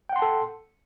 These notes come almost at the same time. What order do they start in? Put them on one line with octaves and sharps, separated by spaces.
G5 F#5 C6 A5 A4